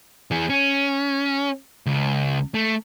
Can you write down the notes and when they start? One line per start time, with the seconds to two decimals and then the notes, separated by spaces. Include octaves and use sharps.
0.31 E3 G#4
0.49 C#4
1.86 C#2
2.54 A3